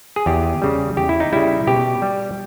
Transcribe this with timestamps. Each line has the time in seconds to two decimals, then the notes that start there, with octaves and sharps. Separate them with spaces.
0.16 G#4
0.26 E2 G4
0.62 C#3 G3
0.97 E2 G4
1.09 E4
1.20 D#4
1.33 C#3 G3 E4
1.67 B2 G4
2.02 G3